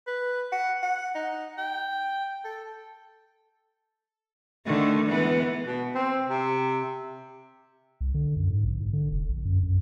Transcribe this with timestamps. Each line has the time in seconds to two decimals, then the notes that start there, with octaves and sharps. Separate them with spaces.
0.07 B4
0.52 F#5
0.83 F#5
1.15 D#4
1.58 G5
2.44 A4
4.66 D3 D#3 A3
5.07 E3 G#3 B3
5.66 B2
5.95 C4
6.30 C3
8.01 C2
8.14 D3
8.36 F#2
8.50 G#2
8.65 A#1
8.80 G#2
8.93 D3
9.11 F1
9.28 A#1
9.45 F#2
9.63 F#2